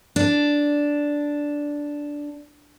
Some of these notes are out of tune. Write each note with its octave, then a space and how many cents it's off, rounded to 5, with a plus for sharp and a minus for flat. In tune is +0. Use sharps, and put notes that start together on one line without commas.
D4 -5